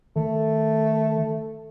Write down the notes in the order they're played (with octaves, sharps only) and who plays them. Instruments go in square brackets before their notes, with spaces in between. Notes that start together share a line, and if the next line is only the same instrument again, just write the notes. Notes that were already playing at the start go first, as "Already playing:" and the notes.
[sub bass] D#3 [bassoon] A3